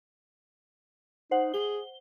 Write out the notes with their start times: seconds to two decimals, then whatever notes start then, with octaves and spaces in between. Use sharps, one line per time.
1.31 D#4 C5 F#5
1.54 G#4 G7